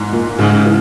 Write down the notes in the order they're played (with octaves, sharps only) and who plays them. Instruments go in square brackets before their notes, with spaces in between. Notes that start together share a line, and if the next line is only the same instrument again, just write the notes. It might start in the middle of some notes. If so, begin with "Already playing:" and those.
Already playing: [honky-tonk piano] E2 G#2
A#2
[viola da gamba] G#2 [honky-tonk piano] C#3
[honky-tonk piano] E3